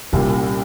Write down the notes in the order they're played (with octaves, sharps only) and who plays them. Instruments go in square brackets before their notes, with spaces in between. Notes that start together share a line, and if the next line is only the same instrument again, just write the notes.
[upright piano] C2 A#2 G3 [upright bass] C#4